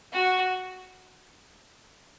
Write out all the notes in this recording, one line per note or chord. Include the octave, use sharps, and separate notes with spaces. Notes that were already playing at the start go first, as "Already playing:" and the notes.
F#4